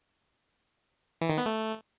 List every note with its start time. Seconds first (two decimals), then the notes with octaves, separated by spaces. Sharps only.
1.21 E3
1.30 D#3
1.38 B3
1.46 A3